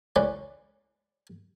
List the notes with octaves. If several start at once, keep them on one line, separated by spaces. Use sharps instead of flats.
C#2 E3 C#4 B4 D5